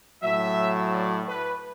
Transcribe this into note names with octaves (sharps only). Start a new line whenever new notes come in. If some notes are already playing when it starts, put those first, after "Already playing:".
A2 F#3 E5
D5
B4